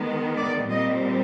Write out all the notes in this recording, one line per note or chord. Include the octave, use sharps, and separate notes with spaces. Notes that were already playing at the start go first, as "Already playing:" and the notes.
Already playing: D#3 G#3 B3
D5
A#2 G3 C4 D#5